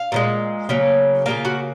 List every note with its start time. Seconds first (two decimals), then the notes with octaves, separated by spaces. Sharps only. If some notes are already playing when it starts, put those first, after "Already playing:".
Already playing: F5
0.12 A#2 F3 G#3
0.69 C#3 F#3 A#3
1.26 C#3 F#3 A#3 F4 F5
1.45 F#4 F#5